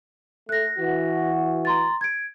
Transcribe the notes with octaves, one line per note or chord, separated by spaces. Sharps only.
A3 F#6 A#6
E3 F#4
A#5 C6 A6
G#6 D7